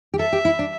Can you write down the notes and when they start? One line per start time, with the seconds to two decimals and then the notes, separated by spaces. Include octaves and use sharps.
0.14 G4
0.19 A4 E5
0.33 G4
0.45 E4
0.59 D4